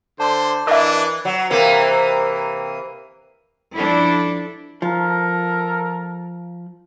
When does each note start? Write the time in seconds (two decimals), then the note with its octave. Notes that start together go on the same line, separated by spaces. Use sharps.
0.20 D3 C5 A5 C6 D6
0.67 E3 D4 A#4 D#5 E5
1.25 F#3
1.50 C3 E3 A#3
3.76 F3 D4 E4 A4
4.82 F3 A4 A#4